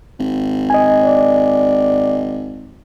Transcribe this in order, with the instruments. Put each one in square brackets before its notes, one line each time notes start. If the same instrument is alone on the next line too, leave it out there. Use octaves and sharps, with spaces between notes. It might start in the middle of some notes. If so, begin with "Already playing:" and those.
[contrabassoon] G#1
[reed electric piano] D#5 G#5
[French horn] D5